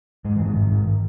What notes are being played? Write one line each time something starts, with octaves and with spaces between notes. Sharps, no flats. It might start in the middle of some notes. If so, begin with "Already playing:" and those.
G#2 G#3
E3
G#2 D#3
G#2
G#2